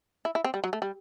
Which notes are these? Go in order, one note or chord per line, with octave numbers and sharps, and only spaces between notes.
E4
E4
C4
G3
F#3
A3
G3